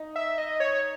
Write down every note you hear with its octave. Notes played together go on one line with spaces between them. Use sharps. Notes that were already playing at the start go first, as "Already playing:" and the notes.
Already playing: D#4
E5
D#5
C#5